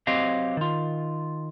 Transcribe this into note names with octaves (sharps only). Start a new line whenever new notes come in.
F#3 C4 G4 D#5 F5
D#3 F4